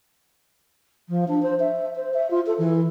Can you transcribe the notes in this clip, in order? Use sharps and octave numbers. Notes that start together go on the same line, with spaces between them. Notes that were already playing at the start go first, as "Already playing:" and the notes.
F3
D4
C5
E5
C5
E5
F4
A4
E3